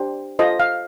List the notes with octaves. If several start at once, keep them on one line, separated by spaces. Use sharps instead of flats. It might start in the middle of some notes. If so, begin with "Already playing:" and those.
Already playing: D4 G4 C5
F4 A4 C5 D#5
F5